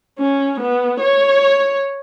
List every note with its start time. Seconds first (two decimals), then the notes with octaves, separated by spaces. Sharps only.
0.19 C#4
0.60 B3
1.01 C#5